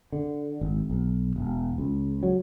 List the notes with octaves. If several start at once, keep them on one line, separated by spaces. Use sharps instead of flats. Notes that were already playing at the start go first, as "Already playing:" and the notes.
D3
G#1
B1
E1
C#2
F#3